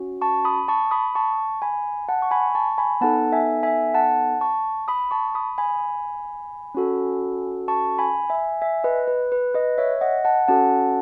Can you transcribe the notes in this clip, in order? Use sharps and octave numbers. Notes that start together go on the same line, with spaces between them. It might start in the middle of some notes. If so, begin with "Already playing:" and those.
Already playing: C#4 F#4
A5 C#6
B5 D#6
A5 C#6
B5 D#6
A5 C#6
G#5 B5
F#5 A5
C#6
G#5 B5
A5 C#6
G#5 B5
B3 D#4 A4 F#5 A5
E5 G#5
E5 G#5
F#5 A5
A5 C#6
B5 D#6
A5 C#6
B5 D#6
G#5 B5
C#4 F#4 A4
A5 C#6
G#5 B5
E5 G#5
E5 G#5
B4 D#5
B4
B4
B4 D#5
C#5 E5
D#5 F#5
F#5 A5
C#4 F#4 A4 F#5 A5